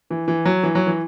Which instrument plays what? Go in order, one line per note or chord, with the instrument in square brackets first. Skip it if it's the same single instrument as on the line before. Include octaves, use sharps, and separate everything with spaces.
[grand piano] E3
E3
F#3
E3
F#3
E3